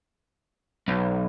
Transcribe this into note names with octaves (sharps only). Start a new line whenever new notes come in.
B1